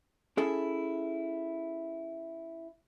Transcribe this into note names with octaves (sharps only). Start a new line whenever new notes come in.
C#4 E4 G#4 A4 E5